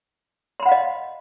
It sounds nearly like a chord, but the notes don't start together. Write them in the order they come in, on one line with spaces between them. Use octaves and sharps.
C6 B5 F#5 F5 D#5